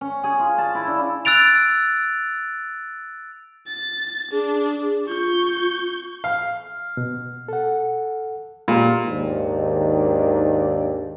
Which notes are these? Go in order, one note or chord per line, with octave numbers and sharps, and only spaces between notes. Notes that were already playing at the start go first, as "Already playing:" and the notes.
C#4
G#4
F4
A5
E4
D4
E6 F#6 A6 D7 F7
A6
D4 G#4
F4 C#6 G6
F5
B2
A4 F#5
A#2 G#3 A#3 G4
D#2 G#2 D#3 D4